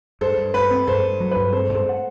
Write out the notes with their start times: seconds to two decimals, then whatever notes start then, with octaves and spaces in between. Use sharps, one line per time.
0.21 G2 A4 C5
0.38 G2
0.54 G2 B4
0.71 C4
0.87 G2 A4 C5
1.04 G2
1.20 F#3
1.31 G2 B4
1.53 C4 A4 C5
1.69 G2
1.74 A4 C5
1.89 F#5